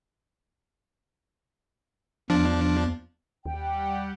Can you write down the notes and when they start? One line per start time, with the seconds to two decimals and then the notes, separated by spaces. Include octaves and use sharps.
2.30 E2 F3 D4
3.46 D#2 G3 G4 F#5 G5